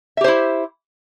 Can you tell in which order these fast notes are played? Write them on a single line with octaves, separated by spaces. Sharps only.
E5 G4 C5 E4